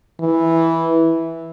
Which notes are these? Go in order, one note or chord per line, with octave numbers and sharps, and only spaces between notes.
E3